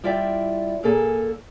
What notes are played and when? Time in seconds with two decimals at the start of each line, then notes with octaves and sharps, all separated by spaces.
0.04 G3 E4 F4 D5 E5 G5
0.83 A#2 A#3 G#4 A4 D5 G#5